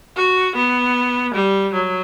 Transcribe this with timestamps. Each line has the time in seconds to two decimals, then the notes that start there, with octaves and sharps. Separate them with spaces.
0.16 F#4
0.56 B3
1.34 G3
1.73 F#3